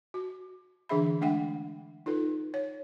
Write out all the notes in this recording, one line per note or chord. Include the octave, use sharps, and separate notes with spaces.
F#4
D3 E3 D4 G#4 E5 B5
G#3 A3 D4 E5 F#5 G5
D#4 F4 A4 B4
C#5